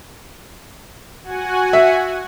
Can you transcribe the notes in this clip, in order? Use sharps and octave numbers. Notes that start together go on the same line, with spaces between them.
F#4 F#5 G#5
E5